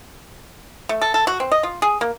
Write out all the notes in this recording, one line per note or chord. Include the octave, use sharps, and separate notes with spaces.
A3
A4
A4
F#4
C4
D#5
F4
G#4
A#3